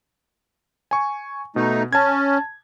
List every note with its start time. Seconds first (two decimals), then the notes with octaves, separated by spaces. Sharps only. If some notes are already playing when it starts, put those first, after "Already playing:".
0.91 G#5 C#6
1.56 B2 A3 D#4
1.93 C#4 A5 G#6